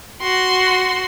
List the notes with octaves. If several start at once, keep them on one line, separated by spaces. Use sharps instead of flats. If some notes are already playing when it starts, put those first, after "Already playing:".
F#4 C6